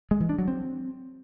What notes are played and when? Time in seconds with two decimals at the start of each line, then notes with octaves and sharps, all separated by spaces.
0.11 G#3
0.20 E3
0.29 D4
0.39 F#3
0.48 C4